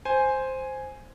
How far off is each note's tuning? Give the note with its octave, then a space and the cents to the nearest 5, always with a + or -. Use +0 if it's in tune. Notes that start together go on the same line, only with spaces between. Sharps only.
C5 +0 G#5 +0